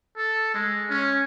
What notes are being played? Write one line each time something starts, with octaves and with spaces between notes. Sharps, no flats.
A4
G#3
C#4